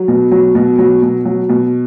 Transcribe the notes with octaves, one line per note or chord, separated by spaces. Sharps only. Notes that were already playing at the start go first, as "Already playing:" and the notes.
Already playing: F#3
B2
F#3
B2
F#3
B2
F#3
B2